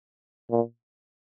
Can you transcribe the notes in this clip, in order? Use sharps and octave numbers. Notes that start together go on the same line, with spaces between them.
A#2